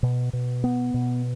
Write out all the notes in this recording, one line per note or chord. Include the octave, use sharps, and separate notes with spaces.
B2
B2
B3
B2